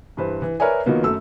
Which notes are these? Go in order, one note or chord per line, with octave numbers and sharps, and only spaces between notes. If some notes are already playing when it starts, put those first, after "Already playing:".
G2 E3 B4 C5
E3
A#4 B4 C#5 D5 E5 G#5
D#3 F3 F#3 A#3 B3
F#2 A3 E6